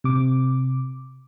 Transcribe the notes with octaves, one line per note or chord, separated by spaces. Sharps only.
C3 D6